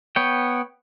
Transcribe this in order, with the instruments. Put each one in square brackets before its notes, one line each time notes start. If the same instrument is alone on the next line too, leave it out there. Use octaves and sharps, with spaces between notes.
[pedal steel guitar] B3 C#5 G5